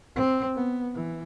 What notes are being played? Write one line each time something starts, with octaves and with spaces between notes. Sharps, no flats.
C4
B3
E3